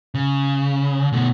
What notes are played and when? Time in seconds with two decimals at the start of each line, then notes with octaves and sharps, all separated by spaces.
0.15 C#3
1.13 B2 A3